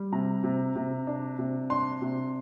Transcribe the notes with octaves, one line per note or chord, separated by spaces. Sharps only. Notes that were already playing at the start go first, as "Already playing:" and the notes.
Already playing: G3
C3 A#5
C3
C3
D4
C3
D4 C6
C3